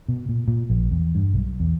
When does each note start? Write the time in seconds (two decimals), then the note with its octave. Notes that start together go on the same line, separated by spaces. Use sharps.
0.08 B2
0.29 A#2
0.48 A#2
0.70 A#1
0.91 E2
1.15 G2
1.34 B1
1.60 E2